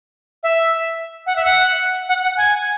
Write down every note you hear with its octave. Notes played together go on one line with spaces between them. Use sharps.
E5
F#5
E5
F#5
F#5
F#5
G#5